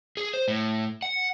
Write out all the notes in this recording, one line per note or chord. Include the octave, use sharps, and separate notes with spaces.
G#4
C5
A2
F#5